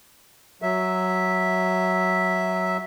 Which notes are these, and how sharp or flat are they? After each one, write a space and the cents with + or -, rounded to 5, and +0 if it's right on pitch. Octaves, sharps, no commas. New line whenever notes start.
F#3 +0 E5 -10